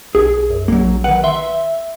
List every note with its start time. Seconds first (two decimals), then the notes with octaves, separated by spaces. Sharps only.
0.15 B1 G#4
0.50 F#2
0.68 A#1 F#3 A#3
1.04 D#3 B4 F#5
1.24 E5 C6